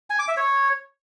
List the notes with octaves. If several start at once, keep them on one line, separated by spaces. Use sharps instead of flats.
G#5
D6
E5
C#5